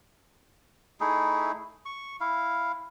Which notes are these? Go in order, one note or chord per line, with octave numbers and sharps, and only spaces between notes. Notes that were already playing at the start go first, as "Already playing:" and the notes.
A3 D#4 E4 G#4
C#6
E4 F5